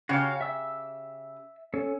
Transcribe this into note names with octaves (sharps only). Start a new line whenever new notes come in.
C#3 F#4 G4 C#5 F5
E5 E6
C#4 A4